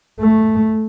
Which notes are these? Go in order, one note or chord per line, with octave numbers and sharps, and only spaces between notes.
A3